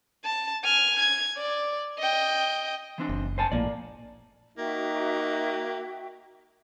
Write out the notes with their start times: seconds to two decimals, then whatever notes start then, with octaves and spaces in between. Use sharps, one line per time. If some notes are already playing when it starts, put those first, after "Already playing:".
0.25 A5
0.64 G#5 F6
1.00 G#6
1.37 D5
1.99 D#5 G5
2.98 E3 C4 D4
3.09 F#1
3.38 C5 G#5 A5
3.52 A#1 A2 A#3 D5
4.58 A#3 D#4 F#4 E5 G5